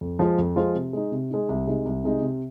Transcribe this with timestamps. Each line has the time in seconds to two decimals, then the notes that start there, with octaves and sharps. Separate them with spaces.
0.01 F2
0.19 F3 G#3 F4 C5
0.38 F2
0.56 F3 G#3 F4 C5
0.75 C3
0.93 G#3 D#4
1.12 C3
1.30 G#3 D#4
1.49 C2
1.66 C3 G#3 D#4
1.85 C2
2.04 C3 G#3 D#4
2.22 C3